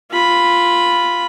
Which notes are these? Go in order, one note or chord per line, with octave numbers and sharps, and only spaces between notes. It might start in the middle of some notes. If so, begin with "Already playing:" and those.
F4 B5